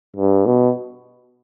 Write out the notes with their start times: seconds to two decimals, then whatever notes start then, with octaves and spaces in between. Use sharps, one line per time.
0.17 G2
0.46 B2